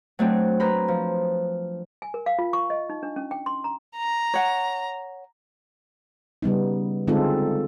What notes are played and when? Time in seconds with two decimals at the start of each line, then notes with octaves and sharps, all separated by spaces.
0.19 F#3 A3 C4 D4
0.60 B4 C5 A#5 B5
0.88 F3
2.02 G#5
2.14 A#4
2.26 F5
2.39 F4
2.53 C#6
2.70 D#5
2.90 D#4
3.03 D4
3.16 C#4
3.31 G5
3.46 C6
3.64 A#5
3.97 A#5
4.34 C#5 F#5
6.42 C#3 G3 B3 D#4
7.07 D3 G#3 C4 D#4 F4 A4